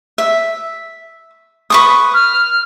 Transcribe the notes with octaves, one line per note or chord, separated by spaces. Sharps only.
E5
B4 C#6 D#6
F6